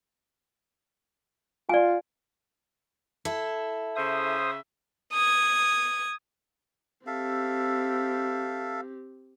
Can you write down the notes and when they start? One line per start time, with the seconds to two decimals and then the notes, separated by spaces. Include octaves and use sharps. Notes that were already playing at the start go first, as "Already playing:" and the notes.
1.69 F4 D5 G#5
3.25 E4 A4
3.96 C#3 C5 E5 D#6
5.13 D#6 G#6
7.07 C4 G4 A4 E5 F5